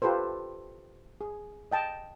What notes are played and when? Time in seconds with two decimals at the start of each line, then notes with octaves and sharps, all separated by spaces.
0.02 F4 G4 A4 B4 C5
1.21 G#4
1.72 D#5 G5 A5